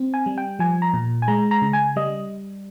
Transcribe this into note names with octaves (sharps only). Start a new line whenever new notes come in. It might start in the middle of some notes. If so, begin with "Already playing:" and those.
Already playing: C4
G#5
G3
G5
F3 G#5
A#5
A#2
G#5
G#3 A#5
A#5
C#3
G#5
G3 D#5